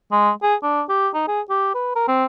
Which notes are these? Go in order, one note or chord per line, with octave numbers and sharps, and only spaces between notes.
G#3
G#4
D4
G4
D#4
G#4
G4
B4
A#4
C4